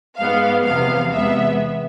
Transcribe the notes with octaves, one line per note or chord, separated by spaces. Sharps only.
G#2 G#3 B3 F5
E2 C3 F3 B3 F5
E2 C3 G#3 B3 E5